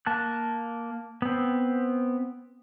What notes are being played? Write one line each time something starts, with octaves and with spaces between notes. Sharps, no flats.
A#3 A5 F#6
B3 C4